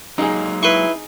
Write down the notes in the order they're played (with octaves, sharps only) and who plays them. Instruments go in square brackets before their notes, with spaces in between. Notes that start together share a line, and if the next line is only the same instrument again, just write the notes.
[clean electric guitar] F#3 G#3 A#3 [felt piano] D#4 G#4
[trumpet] E4 [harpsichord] B4 C6 C#6